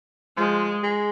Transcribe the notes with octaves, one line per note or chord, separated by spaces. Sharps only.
F3 G#3
G#3